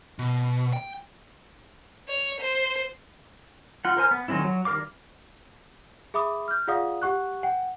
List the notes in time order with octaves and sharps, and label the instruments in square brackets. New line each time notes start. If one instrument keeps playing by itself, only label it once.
[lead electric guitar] B2
G5
[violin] C#5
C5
[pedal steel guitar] F4 F#5
A#4 C5 G#5 F6
B3
D#3 F#3 G#3 C4 E4
F#3
D#3 G3 A#4 F5 D6
[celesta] G#4 E5 B5 D6 D#6
F6 G6
F4 G#4 D5 F5 F#5 D#6
G4 F#5 C#6 F#6
F#5 G5